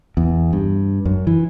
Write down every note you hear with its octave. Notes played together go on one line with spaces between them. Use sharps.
E2
G2
F#2
E3